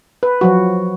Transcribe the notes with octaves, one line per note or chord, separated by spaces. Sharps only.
B4
F3 F#3 F#4